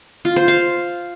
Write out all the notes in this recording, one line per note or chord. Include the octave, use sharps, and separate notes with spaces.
F4
C5
F5